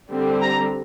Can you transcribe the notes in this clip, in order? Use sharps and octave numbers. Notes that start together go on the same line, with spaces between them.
D3 G3 C4
A#5